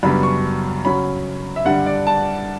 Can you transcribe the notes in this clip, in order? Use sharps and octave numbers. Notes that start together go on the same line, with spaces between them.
F#2 C#3 G3 B3 D4 B5
C#6
C#3 F#3 C#4 B5
E5
G2 D3 G3 D4 F#5
D5
A5